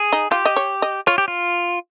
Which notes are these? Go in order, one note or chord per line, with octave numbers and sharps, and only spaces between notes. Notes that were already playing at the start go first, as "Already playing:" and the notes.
Already playing: G#4
D#4
F4 G4
D#5
C#5
D#5
F4 C#5
G4
F4